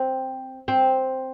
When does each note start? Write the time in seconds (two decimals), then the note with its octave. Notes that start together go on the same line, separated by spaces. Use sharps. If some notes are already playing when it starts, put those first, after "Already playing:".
Already playing: C4
0.68 C4